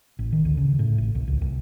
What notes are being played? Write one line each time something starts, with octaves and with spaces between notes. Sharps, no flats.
A1
D#3
D2
C#3
A2
A1
C2
C#2
C2